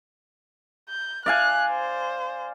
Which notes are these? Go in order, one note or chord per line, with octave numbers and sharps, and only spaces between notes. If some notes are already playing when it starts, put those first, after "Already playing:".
G6
D5 F5 G#5 F#6
C5